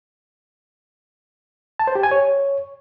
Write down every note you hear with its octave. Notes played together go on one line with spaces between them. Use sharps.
A5
C5
G4
G#5
C#5